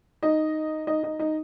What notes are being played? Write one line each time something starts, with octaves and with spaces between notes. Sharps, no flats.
D#4 D#5
D#4 D#5
D#4 D#5
D#4 D#5